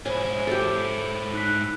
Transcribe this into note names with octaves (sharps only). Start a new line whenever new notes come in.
G#2 E4 C5 C#5 G#5
G4 A4
D#4 F#6 B6